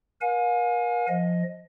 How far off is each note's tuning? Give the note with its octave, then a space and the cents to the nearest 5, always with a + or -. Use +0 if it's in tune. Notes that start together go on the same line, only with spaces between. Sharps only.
A#4 +40 F5 +40 G#5 +10
F3 +0 D#5 +10